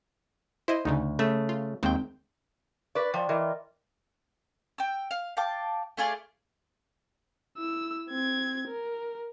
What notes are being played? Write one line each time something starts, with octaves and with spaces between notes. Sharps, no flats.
E4 C5 D#5 E5
D2 C#3 A3 D#4
C#3 A3 E5
F4
D#2 D#3 G#3 C4 G5
B4 D5 C#6
F3 D5 G5
E3 A#4 D#5 C6
G5 E6
F5
F5 G5 A5 D6
A3 F4 G#4 D5
E4 E6
C4 G#6
A#4